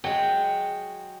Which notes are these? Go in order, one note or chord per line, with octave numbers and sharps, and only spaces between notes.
F#3 G#3 G5